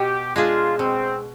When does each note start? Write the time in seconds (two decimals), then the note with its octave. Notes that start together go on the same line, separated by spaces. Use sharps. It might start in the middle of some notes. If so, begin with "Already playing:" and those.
Already playing: B2 G4
0.36 G#3 D4 F4 G#4
0.79 B2 C4